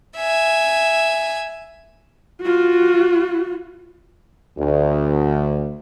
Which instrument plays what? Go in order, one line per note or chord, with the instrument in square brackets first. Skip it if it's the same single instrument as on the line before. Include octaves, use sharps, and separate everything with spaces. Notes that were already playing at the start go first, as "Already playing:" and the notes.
[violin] E5 G#5
[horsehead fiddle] F4 F#4
[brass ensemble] D2